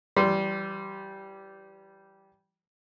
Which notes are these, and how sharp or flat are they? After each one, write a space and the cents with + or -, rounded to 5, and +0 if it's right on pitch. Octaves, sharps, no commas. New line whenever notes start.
E3 +25 G3 -15 C6 -10